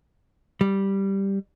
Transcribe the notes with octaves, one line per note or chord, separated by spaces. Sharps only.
G3